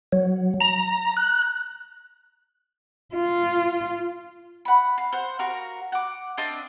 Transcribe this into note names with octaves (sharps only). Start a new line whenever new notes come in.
F#3
A#5
F#6
F4
F#5 B5
F5
C5 F5 F#5
F#4 A#4 F5
F#5 D6
C4 D4 D#5 F5